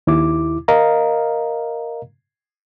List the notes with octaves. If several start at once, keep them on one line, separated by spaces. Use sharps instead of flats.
D#2 E4 D6
A#4 D#5 F5 A#5